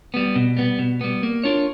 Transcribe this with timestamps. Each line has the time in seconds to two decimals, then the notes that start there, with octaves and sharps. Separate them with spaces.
0.14 G3 B3
0.36 B2
0.57 G3 B3
0.79 B2
1.01 G3 B3
1.23 A#3
1.44 D4 F4 A#4 C#5